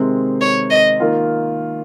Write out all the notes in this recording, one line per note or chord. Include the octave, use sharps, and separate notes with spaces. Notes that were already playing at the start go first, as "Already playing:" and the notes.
Already playing: C3 D#3 G#3 C4
C#5
D#5
D#3 A#3 F4